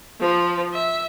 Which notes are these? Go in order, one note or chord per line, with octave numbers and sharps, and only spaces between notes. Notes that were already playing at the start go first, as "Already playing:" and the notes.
F3
E5